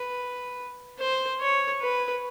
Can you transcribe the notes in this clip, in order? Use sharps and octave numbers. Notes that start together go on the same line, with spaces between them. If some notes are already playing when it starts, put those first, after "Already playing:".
Already playing: B4
C5
C#5
B4